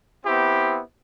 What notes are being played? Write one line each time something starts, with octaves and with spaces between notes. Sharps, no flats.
B3 C4 E4 G4